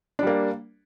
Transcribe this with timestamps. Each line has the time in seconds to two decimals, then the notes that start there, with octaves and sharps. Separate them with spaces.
0.19 D4
0.23 G3
0.27 A#3